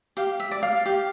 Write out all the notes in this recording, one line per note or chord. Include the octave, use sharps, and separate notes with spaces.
G4 F5
E5
D5
F5
G4